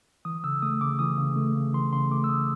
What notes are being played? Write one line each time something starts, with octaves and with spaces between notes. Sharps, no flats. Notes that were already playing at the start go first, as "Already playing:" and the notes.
E3 D#6
C#3 E6
A3 D#6
C#3 D6
E3 D#6
C#3
A3
C#3
E3 C6
C#3 C6
A3 D6
E6
C#3 D#6